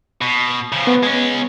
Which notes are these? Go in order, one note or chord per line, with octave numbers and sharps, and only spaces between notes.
B2
C#3 F3
B3
G#3 C#4